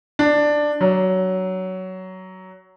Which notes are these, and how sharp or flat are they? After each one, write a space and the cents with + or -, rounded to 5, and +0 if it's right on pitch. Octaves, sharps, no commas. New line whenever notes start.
D4 +10
F#3 +15